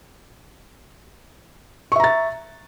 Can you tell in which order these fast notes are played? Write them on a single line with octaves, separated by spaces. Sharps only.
C#6 E5 A#5 A6